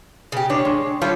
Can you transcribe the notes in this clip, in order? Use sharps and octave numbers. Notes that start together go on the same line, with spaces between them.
C#3 G4
D4 C#5
G#3
G3 F4 A4 C#5